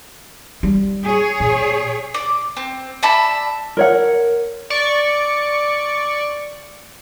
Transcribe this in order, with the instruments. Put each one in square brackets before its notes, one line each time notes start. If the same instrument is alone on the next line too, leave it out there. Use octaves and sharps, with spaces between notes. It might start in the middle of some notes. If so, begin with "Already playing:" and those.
[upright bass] G3
[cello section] G#4 C#5
[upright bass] A#2
[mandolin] D5
C4
D5 E5 A5 B5
[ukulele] A#4 C#5 F#5
[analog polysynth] D5 C#6